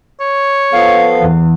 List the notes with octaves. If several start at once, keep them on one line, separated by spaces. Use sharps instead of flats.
C#5
F3 B3 A4 F5
E2